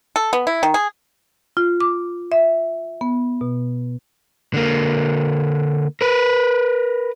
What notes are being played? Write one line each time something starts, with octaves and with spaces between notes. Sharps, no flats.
A4
B3
E4
D#3
G#4
F4
D6
E5
B3
B2
D3 A#3
A#4 B4